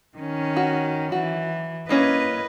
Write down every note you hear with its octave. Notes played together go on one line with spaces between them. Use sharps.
D#3 C#4
F#4
E3 F#4
E3 A#3 C#4 B4 D#5